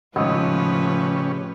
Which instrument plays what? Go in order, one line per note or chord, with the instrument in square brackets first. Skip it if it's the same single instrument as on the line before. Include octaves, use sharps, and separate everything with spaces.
[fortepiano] G#1 D#6 [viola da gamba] A2 F3 B4 [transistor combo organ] C#3 C#4 G4